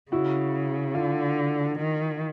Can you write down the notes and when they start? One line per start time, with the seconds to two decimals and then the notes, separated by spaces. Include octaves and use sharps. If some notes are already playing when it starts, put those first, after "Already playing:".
0.11 C#3 E4 F#4
0.95 D3 F4
1.79 D#3